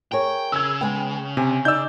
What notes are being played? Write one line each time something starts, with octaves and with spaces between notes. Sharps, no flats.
G#4 A#4 C#5 G5
C#3 E6 G#6
G#3 B3 G5
C3 G#5
D#4 D5 E6 G6